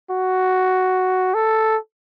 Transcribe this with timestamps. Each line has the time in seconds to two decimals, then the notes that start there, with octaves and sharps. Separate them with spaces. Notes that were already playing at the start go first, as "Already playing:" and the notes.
0.10 F#4
1.34 A4